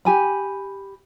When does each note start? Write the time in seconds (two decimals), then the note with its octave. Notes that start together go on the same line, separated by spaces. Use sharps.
0.05 G4 G#5 B5